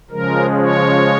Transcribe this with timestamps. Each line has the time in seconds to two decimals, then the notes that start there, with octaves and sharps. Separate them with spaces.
0.11 C#3 F3 G#3 A#4
0.61 C#5